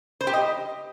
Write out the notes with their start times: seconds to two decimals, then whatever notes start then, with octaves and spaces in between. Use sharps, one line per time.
0.21 C5
0.27 G4
0.33 D#5